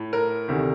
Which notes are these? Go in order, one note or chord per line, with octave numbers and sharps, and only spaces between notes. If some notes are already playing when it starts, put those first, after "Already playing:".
Already playing: A2
A#4
D2 C3 D#3